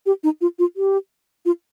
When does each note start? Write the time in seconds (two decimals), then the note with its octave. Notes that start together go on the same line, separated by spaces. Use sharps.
0.06 G4
0.23 D#4
0.41 F4
0.59 F4
0.76 G4
1.45 F4